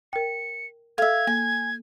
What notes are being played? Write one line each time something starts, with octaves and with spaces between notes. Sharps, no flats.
A#4 G5 C#7
A4 E5 F5 G#6
A#3 G#5